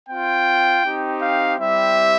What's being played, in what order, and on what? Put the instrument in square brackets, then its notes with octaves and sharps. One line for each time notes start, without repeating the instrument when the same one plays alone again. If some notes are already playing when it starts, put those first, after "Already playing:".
[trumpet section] C4 F4 G5
C4 D#4 G4
F5
G3 C4 E4 G4 E5